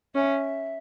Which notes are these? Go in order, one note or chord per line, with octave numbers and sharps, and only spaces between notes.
C#4 E5